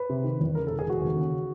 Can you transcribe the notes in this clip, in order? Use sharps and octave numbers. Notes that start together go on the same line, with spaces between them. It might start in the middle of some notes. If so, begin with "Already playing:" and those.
Already playing: B4
C3
D#3
E2
C#3 A#4
A4
E1
G#4
E1 F#4
D#2
C#3